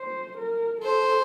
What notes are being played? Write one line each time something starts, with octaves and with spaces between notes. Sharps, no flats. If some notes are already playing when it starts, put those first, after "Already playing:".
Already playing: C5
A#4
A4 C5